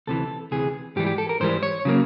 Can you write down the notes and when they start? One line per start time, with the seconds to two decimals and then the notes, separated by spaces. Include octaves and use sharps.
0.07 D2 C3 E3 A4
0.51 D2 C3 E3 G#4
0.96 G#2 E3 G3 G4
1.07 G4
1.18 A4
1.29 A#4
1.40 G#2 E3 G3 C5
1.63 C#5
1.85 C#3 F#3 A#3